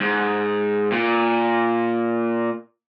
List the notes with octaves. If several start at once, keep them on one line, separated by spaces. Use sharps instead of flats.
G#2
A#2